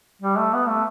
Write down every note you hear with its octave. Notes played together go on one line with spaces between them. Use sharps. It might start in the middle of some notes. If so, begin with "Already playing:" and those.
G3
A3
B3
A3